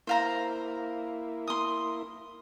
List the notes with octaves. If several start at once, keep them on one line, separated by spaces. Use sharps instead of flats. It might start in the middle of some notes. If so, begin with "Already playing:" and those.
A#3 E4 C5 F5 A#5
C6 D#6